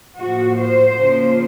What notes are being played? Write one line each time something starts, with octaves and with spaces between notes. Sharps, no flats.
A2 F3 A#3 F#4
C5
C#3 F3 A#3